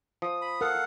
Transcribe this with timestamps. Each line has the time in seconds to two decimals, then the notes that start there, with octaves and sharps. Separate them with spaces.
0.22 F3 D#6
0.42 B5
0.61 A4 A#4 F5 F#5